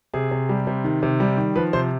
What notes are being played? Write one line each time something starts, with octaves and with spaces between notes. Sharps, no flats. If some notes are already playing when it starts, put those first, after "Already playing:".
C3 G#4
C3
G3
C3
D#3
C3
G3
D#3
F3 B4
C3 C5